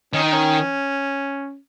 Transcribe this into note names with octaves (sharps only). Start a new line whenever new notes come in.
D#3 C#4
D#4
C#4